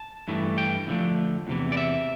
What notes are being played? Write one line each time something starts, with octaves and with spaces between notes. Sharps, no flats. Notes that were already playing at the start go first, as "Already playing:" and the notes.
Already playing: A5
G2 E3 A3
G5
E2 D3 F3 A3
E2 C3 E3
D5
E5